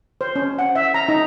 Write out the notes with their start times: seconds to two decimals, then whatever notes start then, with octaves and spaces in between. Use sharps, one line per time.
0.21 C5
0.36 C#4
0.59 F#5
0.75 E5
0.94 A#5
1.09 D#4